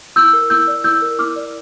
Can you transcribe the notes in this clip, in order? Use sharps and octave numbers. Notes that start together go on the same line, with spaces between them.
E4 E6 G6
A#4
E4 E6 G6
D5
E4 E6 G6
A#4
E4 D6 F6
D5